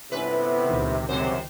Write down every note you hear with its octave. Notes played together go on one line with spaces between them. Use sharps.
G1 C3 B3 C#4 E4 B4
C#2 A#2 D#3
F#2 C3 G3 G4 C5